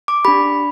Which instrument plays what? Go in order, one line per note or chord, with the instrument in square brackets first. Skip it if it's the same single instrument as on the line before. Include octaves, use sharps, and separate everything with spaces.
[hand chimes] D6
D4 G4 B5